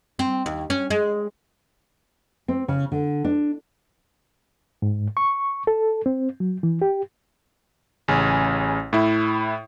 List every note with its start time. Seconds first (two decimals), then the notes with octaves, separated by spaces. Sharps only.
0.19 C4
0.46 D#2
0.70 C#4
0.90 G#3
2.48 C4
2.68 C#3
2.92 D3
3.24 D4
4.82 G#2
5.17 C#6
5.67 A4
6.06 C4
6.40 F#3
6.63 E3
6.82 G4
8.08 A1 C#3 G#5
8.93 A2 E4